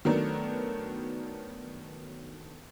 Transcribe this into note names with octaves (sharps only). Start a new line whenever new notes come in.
D#3 F#3 A3 B3 D4 A#4